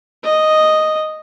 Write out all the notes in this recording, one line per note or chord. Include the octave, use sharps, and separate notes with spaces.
D#5